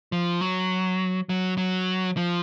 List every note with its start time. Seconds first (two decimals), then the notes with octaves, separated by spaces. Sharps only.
0.12 F3
0.41 F#3
1.29 F#3
1.57 F#3
2.17 F3